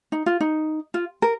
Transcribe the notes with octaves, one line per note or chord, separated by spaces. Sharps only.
D#4
F4
D#4
F4
A#4